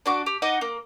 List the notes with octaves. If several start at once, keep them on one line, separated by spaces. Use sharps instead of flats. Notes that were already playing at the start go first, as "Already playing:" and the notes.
D4 F#4 D6
G4
D#4 D#5 F#5 D6
A#3